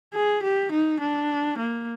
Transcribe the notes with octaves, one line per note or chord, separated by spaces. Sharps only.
G#4
G4
D#4
D4
A#3